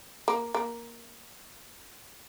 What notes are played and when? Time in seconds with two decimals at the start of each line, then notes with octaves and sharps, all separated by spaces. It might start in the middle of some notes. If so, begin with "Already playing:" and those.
0.28 A#3
0.54 A#3